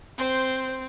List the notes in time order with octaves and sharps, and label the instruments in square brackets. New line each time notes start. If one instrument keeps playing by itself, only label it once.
[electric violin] C4 [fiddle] C5